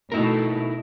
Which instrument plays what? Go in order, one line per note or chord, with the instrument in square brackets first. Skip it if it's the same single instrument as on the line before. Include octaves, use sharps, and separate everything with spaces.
[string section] B2 A3 [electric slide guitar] D#4 E4 A#4